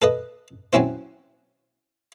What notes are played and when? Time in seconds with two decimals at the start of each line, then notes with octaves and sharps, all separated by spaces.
0.02 A4 B4 D#5
0.73 F#3 C4 C#4 E4 C5